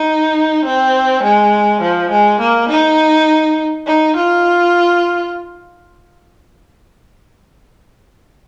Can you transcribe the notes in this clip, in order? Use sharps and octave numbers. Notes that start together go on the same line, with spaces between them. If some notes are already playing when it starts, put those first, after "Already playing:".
Already playing: D#4
C4
G#3
F3
G#3
A#3
D#4
D#4
F4